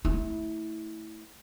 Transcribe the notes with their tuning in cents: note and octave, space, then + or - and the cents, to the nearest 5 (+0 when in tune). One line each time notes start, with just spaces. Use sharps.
A3 +5 E4 -20